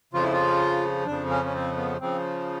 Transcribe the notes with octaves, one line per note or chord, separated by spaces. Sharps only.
F2 C#3 F3 F4
E4
F4
F2 C#3 F3 D4
C#4
C#4
C4
B3
C#3 F3 C4